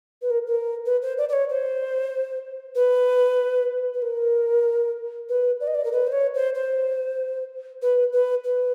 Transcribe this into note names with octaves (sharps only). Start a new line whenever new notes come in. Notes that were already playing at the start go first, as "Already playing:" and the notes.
B4
A#4
A#4
B4
C5
D5
D5
C#5
C5
B4
B4
A#4
B4
D5
D#5
D5
A#4
B4
C5
C#5
C5
C5
B4
B4
B4